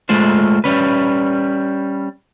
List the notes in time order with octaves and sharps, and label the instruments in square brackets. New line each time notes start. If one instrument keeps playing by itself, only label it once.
[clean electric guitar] G#3 A3 F4 C5
G3 C#4 B4